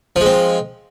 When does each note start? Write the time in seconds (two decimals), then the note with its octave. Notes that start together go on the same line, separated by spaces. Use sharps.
0.16 F3
0.21 G#3
0.26 C4